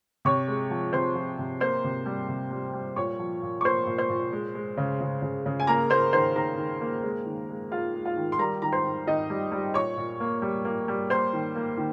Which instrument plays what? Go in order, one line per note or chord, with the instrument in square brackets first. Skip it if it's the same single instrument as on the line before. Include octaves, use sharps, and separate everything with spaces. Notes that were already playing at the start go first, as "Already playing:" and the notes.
[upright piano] C3 C#5 C#6
G#3
F3
C3 C5 C6
F3
C3
A#3 C5 C6
C3
G3
C3
G3
G3
A#2 C#5 C#6
F3
A#2
C#6
A#3 C5 C6
A#2
C5 C6
A#2
G#3
G#3
C#3
C#3
C#3
C#3
G#5
A#3 A#4 A#5
A#3 C5 C6
D#3 C5 C6
D#3 A#4 A#5
D#3
A#3
G#3
D#3
G#3
G#3 F4 F5
G#3
F4 F5
D#3
C6
G3 A#4 A#5
D#3 A#5
C5 C6
D#3
D#3 D#4 D#5
G3
G3
A#2 C#5 C#6
A#2
A#3
G3
A#3
G3
A#3 C5 C6
D#3
A#3
D#3